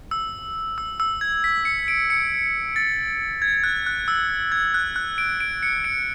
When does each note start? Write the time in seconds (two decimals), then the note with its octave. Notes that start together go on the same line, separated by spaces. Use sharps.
0.11 E6
0.78 E6
1.00 E6
1.21 G#6
1.44 B6
1.65 C#7
1.88 D7
2.10 C#7
2.76 A6
3.42 G#6
3.64 F#6
3.86 F#6
4.08 E6
4.52 G#6
4.74 F#6
4.96 F#6
5.18 D7
5.40 D7
5.63 C#7
5.84 D7